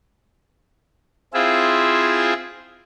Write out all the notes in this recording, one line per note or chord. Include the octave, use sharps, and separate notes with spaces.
C4 E4 F4 G#4 E5